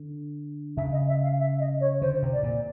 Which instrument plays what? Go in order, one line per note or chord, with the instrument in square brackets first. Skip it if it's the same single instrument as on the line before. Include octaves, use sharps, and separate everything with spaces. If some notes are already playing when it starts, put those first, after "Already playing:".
Already playing: [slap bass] D3
[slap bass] C#3 [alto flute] E5
[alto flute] D#5
E5
F5
E5
D#5
C#5
[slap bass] D3 [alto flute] C5
[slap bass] C3
[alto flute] D5
[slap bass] A#2